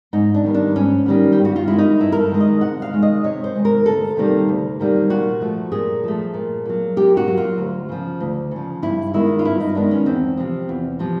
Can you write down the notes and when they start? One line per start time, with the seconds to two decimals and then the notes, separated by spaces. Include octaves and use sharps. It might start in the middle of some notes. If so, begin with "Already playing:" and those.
0.13 G#2 D#4
0.34 D4
0.44 D#3 G3 B3
0.54 D4
0.76 G#2 C#4
1.06 D#3 G3 B3
1.32 G4
1.38 G2
1.45 F#4
1.56 F4
1.68 D#3 G#3 E4
1.78 D#4
2.00 G2 E4
2.12 A#4
2.20 A4
2.31 D#3 G#3
2.40 D#5
2.61 C3 F#5
2.82 F5
2.93 D#3 G#3
3.02 D#5
3.24 C3 C#5
3.44 C5
3.55 D#3 G#3
3.65 A#4
3.86 D2 A4
4.17 C3 D#3 G3 A#3
4.49 D2
4.80 C3 D#3 G3 A#3
5.10 A#2 F#4
5.41 F3 A3
5.72 A#2 G#4
6.04 F3 A3
6.34 A#2
6.65 F#3 A#3
6.96 A#2 G4
7.17 F#4
7.27 F#3 A#3
7.37 F4
7.58 D2
7.89 C#3 F3
8.20 D2
8.51 C#3 F3
8.82 G2 E4
9.14 D#3 G#3 B3 E4
9.39 F4
9.45 G2 E4
9.60 D#4
9.75 D#3 G#3 B3 D4
9.91 C#4
10.06 E2 C4
10.37 C3 F3
10.69 E2
10.99 C3 F3